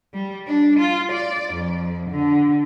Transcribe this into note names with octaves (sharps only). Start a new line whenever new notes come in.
G3
D4
F4
D5
F2
D3